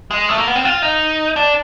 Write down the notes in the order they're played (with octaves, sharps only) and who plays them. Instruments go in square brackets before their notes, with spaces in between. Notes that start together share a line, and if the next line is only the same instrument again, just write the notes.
[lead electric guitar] G#3
A3
A#3
B3
C4
F4
D#4
D4